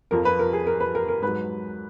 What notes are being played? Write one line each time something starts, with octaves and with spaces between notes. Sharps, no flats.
F2 F3 A#4
B4
A#4
G#4
A#4
B4
A#4
A#4
G#2 F#3 B4